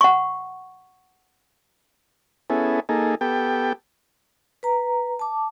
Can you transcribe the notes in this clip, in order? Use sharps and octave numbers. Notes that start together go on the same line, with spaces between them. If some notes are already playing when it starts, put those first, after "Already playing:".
F#5 C#6
B3 C#4 E4 G#4 A4
A#3 D#4 G#4 A4
B3 G4 A4 G5
B4 A#5
A5 D6